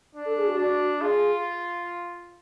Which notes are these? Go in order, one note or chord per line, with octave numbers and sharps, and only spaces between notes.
D4
A4
G#4
F#4
D4
F4 G#4